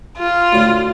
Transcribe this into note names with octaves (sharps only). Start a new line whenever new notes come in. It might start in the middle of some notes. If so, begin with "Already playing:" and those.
F4
D2 A2